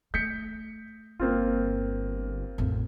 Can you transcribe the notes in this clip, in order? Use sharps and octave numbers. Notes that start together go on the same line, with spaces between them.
A3 G6 B6 C#7
G1 A#3 C4 F4
A1 F2